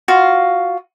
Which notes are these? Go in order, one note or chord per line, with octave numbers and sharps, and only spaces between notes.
F4 F#4 F5